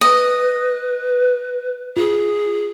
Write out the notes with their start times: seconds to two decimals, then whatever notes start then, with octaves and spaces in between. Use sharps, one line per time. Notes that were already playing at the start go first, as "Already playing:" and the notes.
0.01 B4 D#5
1.97 F4 G#4